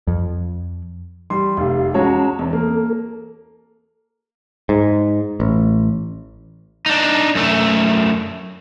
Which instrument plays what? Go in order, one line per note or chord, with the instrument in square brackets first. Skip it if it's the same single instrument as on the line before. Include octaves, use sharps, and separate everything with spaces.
[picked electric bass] F2
[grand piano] G3 C6
[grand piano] F1 [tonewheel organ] G4 F5
[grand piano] G#3 F#4 C#5 [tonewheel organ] C#4 A5 A#5
[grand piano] E2 [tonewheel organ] C4
[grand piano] A#3 [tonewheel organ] A4
[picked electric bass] G#2
A1
[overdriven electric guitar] D4 D#4
F#2 A3